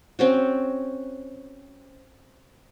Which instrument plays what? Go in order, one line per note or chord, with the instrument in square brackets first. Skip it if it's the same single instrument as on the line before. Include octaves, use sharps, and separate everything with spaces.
[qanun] C4 C#4 F#4